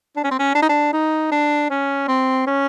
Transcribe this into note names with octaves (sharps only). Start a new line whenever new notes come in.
D4
C#4
C4
C#4
D4
D#4
D4
D#4
D4
C#4
C4
C#4